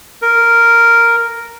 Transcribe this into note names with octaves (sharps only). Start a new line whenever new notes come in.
A#4